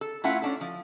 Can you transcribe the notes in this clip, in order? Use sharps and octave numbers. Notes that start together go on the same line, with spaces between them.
A4
A3 C#4 E4 F4 E5 F#5
C#4 D4 A4
F3